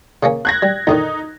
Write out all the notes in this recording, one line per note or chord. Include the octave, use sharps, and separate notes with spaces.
C#3 A#3 C#4
F#6 G#6 A#6
G3
F2 D3 D#3 D#4